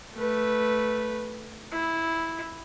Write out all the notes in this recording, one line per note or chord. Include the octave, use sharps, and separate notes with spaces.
A3 B4
E4